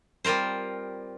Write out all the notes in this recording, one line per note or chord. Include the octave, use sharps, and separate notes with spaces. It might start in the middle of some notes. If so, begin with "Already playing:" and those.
G3 C4 F4 A#4 C5